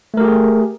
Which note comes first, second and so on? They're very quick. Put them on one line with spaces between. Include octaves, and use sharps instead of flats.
A3 A#4 G4 G#4